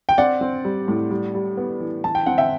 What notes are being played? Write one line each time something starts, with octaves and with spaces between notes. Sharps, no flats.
G5
C4 D5 F#5
C4
G3
A2
G3
G3
B3
E3
E3 A5
G5
C4 F#5
E5 G5